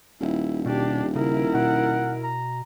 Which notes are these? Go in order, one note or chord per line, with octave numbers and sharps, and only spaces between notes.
D#1 E4
B2 D4 G4
C#3 E4 A#4
B2 F#5
A#5